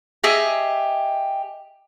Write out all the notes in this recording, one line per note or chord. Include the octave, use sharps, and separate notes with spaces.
G4 G#4 D#5 E5